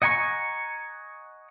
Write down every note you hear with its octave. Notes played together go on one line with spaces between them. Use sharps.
D#5 F#5 G#5 A#5 C#6